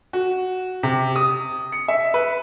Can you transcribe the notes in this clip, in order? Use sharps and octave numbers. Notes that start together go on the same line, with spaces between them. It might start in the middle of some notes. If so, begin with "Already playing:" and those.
F#4
C3
D#6
C#7
E5
B4